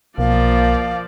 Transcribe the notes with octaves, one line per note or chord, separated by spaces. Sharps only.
B1 F3 A#3 D5 F5